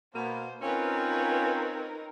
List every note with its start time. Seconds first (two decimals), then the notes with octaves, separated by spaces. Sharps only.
0.15 B2 A#3 B3 C5
0.62 C4 C#4 D#4 F4 A#4 B4 C#5